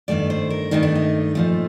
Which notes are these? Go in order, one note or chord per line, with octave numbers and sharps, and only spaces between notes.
G2 D#3 A3 D5
C5
A#4
G2 D#3 A3 D#4
D4
D#4
A#2 F3 A3